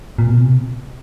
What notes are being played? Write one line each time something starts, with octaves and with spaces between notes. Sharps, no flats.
A#2
B2
C3